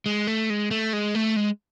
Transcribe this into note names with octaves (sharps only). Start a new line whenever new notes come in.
G#3
A3
G#3
A3
G#3
A3
G#3